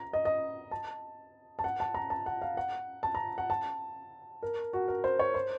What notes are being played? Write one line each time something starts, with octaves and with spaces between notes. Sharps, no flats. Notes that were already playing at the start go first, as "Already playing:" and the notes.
Already playing: A#5
D#5
D#5
A5
A5
F#5
A5
A#5
A5
F#5
F5
F#5
A5
A#5
F#5
A5
A#4
F#4
A#4
C5
C#5
C5